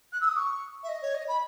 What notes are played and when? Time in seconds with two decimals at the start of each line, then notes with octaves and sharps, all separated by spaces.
0.13 F#6
0.21 E6
0.28 D#6
0.37 C#6
0.83 E5
0.89 D#5
1.02 C#5
1.15 D#5
1.28 B5